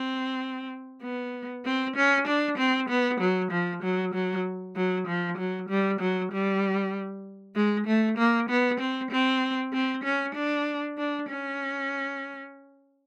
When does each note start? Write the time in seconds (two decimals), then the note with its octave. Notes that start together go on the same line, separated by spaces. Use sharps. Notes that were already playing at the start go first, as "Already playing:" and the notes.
Already playing: C4
1.03 B3
1.65 C4
1.96 C#4
2.27 D4
2.58 C4
2.89 B3
3.20 F#3
3.52 F3
3.83 F#3
4.14 F#3
4.76 F#3
5.07 F3
5.38 F#3
5.69 G3
6.00 F#3
6.32 G3
7.55 G#3
7.87 A3
8.18 A#3
8.49 B3
8.80 C4
9.11 C4
9.73 C4
10.04 C#4
10.35 D4
10.98 D4
11.29 C#4